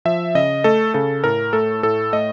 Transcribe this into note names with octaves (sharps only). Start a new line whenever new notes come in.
F3 E5
C#3 D#5
A3 A4
C#3 A4
A2 A#4
A3 A4
A2 A4
A3 D#5